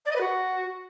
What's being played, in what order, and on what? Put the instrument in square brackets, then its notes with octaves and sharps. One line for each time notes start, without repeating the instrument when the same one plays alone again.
[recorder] D5
D#5
B4
F#4